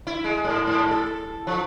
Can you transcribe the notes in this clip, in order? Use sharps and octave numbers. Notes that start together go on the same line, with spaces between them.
E4
G#3
G#2
G#2
A4
F3